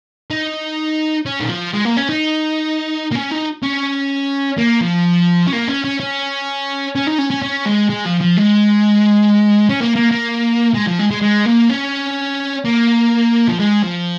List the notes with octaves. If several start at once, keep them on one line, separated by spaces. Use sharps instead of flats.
D#4
C#4
D#3
F3
G#3
A#3
C#4
D#4
A#3
C#4
D#4
C#4
A#3
F3
C#4
A#3
C#4
C#4
C#4
C#4
D#4
C#4
C#4
C#4
G#3
G#3
F3
F3
G#3
C#4
A#3
A#3
A#3
G#3
F3
G#3
G#3
G#3
A#3
C#4
A#3
F3
G#3
F3